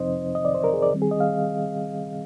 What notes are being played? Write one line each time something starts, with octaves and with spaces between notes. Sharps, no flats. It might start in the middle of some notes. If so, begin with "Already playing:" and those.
Already playing: F2 C3 F3 C4 D#4 C5 D#5
D#5
D5
C5
A#4
G#4
D5
D#3 G3 C4
G#4
D#5
F5